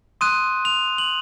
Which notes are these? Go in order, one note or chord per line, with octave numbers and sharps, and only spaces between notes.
C6 D#6 F#6 D#7
F7
F#7